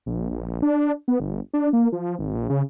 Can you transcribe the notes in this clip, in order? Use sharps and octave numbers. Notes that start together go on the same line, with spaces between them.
A#1
A#1
D4
B3
G1
D4
A#3
F3
G#1
A#1
C#3